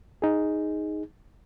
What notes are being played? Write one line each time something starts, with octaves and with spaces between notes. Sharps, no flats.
D#4 G#4